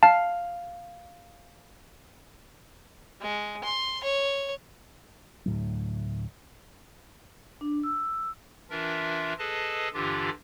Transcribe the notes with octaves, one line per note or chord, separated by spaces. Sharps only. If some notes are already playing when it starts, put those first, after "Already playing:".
F5 A5
G#3
C6
C#5
D2 A2 F#3
D4
E6
E3 D4 F4 A#4 E5
G#4 A4 B4 D#5 A5
G2 D3 E3 D4 F4 G4